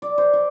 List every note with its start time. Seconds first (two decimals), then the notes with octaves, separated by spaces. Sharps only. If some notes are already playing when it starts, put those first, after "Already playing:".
0.02 D5
0.18 C5
0.33 D5